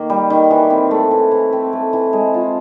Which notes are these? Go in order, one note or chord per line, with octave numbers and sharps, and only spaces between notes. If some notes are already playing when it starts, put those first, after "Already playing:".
Already playing: D#3 A#3
G3
D#3
E3
C4
A3
E3
E3
C4
A3
E3
G#3
F4